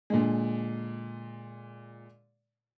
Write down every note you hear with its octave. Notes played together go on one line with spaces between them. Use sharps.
A#2 D3 G#3